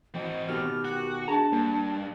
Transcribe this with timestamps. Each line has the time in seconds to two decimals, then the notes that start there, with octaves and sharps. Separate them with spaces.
0.15 E3 C4 F#4 D#5
0.49 B2 D#3 G4 F6
0.85 F#4 F#6
1.28 D4 G#4 A5 A#5
1.53 G2 A#3